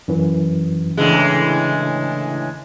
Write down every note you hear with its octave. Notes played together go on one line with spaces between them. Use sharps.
F#2 E3
A2 C#3 E3 G#3 D4